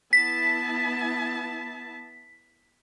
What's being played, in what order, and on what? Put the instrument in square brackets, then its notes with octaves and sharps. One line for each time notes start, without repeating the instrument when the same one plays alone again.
[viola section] B3 E4 A5 [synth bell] B6